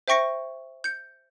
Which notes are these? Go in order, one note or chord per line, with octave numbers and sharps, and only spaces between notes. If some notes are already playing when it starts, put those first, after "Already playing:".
C5 E5 G5 C#6 A#6 C#7
G6 C#7